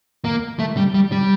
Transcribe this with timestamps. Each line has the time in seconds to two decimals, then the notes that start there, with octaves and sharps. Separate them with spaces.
0.25 A#3
0.59 A3
0.77 G3
0.94 G3
1.12 G3